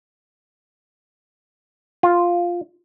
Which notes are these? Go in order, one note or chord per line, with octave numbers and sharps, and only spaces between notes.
F4